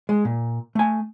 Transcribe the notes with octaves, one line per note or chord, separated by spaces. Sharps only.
G#3
A#2
A3 G#5